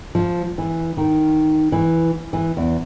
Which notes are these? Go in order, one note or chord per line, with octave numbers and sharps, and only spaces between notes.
F3
E3
D#3
E3
E3
E2